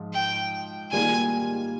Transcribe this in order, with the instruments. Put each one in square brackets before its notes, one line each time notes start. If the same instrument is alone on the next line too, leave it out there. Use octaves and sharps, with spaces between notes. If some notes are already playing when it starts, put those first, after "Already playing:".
Already playing: [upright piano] G#2 F3
[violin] G5
[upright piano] D#3 G3 A#3 F4 G#4 [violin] G#5